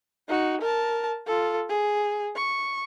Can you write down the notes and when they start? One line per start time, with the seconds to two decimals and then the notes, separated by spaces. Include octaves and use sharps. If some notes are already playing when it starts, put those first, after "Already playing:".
0.28 D#4 F#4
0.61 A#4 A5
1.26 F4 A4
1.69 G#4
2.36 C#6